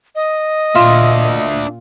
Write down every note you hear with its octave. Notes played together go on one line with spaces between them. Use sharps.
D#5
A#2 D4 F4 E5